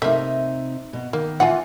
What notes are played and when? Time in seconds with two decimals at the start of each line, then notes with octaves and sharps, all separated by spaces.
0.02 C3 A3 A#3 D#4 E5
0.93 B2
1.13 D#3 A#3
1.40 E3 F4 F#5 G#5